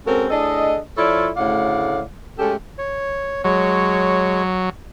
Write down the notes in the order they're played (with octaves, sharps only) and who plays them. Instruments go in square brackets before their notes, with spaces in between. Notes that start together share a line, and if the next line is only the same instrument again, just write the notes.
[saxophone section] G#3 C4 C#4 F#4 A4 A#4
A2 D4 G#4 A4 D#5
F3 E4 F4 A4 C#5 D5
D2 A2 C#3 D5 F5 F#5
G#3 A3 C#4 G4 A4
[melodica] C#5
[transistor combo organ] F#3 [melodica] G#3 C#5